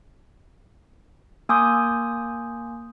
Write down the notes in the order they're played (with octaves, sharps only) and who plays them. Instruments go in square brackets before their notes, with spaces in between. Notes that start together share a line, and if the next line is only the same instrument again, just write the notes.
[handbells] A#3 G#5 C6 D6 D#6 G6